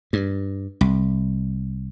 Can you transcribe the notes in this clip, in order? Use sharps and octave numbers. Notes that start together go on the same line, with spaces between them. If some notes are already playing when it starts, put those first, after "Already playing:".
G2
C2